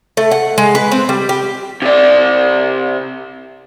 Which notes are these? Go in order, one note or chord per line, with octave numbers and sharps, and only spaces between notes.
A3
F#5
G#3
B4
C4
G3
G4
C3 D5